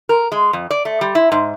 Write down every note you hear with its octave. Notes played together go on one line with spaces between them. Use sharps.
A#4
G#3
F2
D5
A3
G3
E4
G#2